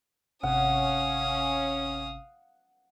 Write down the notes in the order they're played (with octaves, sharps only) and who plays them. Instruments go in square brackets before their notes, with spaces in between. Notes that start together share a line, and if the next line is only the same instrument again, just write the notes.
[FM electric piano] G#1 C3 [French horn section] C#4 [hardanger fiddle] F5 D#6 [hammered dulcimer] F#5